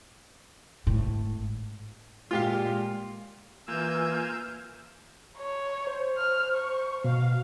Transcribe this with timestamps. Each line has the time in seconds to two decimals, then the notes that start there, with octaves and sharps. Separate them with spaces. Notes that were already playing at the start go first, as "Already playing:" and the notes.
0.87 G#1 A2
2.31 A#2 G#3 F4 G4 F5
3.68 E3 A#3 F4 G#5 E6 G6
5.38 C#5
5.87 C5
6.18 F6
6.55 C#6
7.04 B2 F5